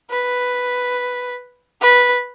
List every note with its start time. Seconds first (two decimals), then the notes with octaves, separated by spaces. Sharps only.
0.10 B4
1.81 B4